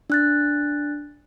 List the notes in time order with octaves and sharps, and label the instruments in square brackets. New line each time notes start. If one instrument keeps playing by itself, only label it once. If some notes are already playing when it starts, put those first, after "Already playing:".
[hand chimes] D4 F#6 A6